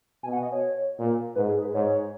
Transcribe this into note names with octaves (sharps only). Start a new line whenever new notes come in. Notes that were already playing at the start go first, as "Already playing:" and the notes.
B2 G#5
F#5
D#5
C#5
A#2
G#2 B4
G#4
B4
G#2 C#5